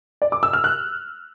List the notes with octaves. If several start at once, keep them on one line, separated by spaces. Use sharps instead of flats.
D5
D6
E6
F6
F#6